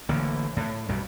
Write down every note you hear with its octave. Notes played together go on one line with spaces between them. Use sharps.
A1 D3 A#3
A2
B1 G2 G3